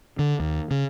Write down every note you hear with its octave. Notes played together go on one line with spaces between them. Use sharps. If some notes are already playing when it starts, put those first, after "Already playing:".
D3
D#2
C#3